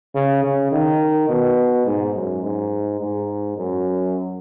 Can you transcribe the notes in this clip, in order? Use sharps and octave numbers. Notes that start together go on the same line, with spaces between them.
C#3
C#3
D#3
B2
G#2
F#2
G#2
G#2
F#2